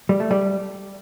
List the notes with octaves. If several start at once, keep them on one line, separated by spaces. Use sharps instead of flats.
G3
A3
G3